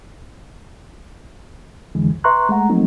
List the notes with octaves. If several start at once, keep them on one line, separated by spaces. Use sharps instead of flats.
F2 D3 E3 G#3
C#2
B4 E5 A#5 C6 C#6 F#6
G#3 A3 F#5 A#5
F3 F#3 A3 A#3 C4 D#4